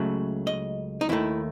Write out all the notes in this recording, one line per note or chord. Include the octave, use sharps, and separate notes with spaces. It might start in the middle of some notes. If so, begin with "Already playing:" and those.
Already playing: C#2 C#3 F#3 A3 E5
D#5
D#4
D#2 D#3 A3 E4